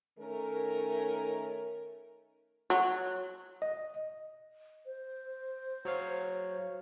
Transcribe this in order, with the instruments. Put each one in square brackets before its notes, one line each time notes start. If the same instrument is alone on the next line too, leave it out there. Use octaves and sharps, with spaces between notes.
[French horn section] D#3 A3 C#4 A#4
[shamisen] F#3
[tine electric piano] D#5
[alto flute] C5
[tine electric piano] F#3 C#5 F5